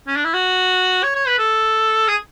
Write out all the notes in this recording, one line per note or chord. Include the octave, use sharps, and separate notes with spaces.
C#4
D4
E4
F#4
C#5
C#5
B4
A4
G#4